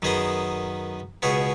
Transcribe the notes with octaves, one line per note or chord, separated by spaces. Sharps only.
F#2 D#3 B3 G#4 D#5
C#2 B2 B3 G#4 C#5